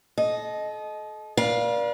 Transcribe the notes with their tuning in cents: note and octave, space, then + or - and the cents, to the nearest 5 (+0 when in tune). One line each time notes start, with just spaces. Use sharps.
A4 -35 D#5 +0
B4 -45 D5 +0 F5 +0